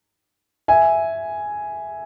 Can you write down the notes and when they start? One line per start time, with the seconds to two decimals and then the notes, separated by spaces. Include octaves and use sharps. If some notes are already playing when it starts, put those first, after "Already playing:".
0.68 E5 G#5